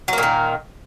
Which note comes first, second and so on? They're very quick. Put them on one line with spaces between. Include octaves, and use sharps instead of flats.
F#3 A#3 A#2 D#3